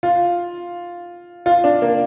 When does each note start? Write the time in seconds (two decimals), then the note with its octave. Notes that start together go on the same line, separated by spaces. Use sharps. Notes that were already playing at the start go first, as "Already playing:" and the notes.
0.03 F4
1.46 F4
1.64 D4
1.82 A#3